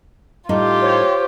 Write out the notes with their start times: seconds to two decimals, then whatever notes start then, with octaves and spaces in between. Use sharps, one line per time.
0.49 A2 G3 D#4 F4 G4
0.82 C5 C#5